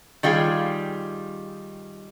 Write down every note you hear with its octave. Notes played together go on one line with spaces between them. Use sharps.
D#3 G3 F4 G4 G#4